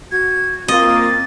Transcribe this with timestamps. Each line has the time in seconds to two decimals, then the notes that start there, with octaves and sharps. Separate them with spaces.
0.11 F#4 G#6
0.68 A#3 C4 F4 D#5 A6